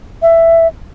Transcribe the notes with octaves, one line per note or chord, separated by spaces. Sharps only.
E5